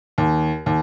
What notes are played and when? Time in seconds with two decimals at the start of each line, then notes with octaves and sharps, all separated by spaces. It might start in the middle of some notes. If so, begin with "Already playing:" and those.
0.18 D#2
0.66 D#2